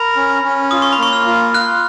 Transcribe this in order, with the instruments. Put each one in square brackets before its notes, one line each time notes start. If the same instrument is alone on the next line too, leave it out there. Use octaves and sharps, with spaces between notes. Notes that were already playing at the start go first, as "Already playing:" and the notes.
Already playing: [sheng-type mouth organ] A#4 [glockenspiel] B5
[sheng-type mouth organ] C#4
C#4
[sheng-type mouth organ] F4 [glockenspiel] D#6
[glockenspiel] C#6
B5
[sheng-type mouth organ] A#3 [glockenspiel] C#6
[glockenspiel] F6
[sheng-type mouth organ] F4
[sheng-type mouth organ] F4 [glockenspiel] F#6